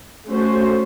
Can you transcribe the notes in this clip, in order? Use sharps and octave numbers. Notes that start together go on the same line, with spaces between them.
A3 C#4 F#4 C5